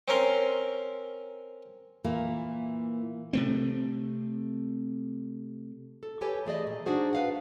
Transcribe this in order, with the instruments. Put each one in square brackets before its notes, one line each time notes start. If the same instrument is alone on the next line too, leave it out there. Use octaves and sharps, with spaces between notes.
[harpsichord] C4 C#4 A#4 C6
[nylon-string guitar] A#2 E3 A#3
[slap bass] C3 A3 C4
[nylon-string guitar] A4
G4 A4 B4 C#5 G#5
E3 A3 G#4 D5 D#5
A#2
D4 D#4 F#4 G#4 C5
B4 F5 F#5